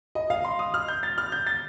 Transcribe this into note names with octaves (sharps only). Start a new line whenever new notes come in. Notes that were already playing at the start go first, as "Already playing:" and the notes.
D#5
F5
C6
D#6
F6
G6
A6
F6
G6
A6